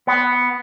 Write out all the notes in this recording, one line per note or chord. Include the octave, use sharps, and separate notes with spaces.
B3